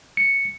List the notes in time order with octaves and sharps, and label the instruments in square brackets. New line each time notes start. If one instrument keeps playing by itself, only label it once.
[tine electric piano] C#7